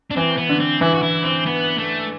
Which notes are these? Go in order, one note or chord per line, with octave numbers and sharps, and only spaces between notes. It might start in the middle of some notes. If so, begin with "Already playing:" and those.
D4
E3 C4
B3
D3
C4
E3 E4
F#4
E4
C4
B3
A3